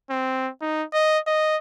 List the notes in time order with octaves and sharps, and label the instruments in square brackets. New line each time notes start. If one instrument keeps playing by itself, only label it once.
[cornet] C4
D#4
D#5
D#5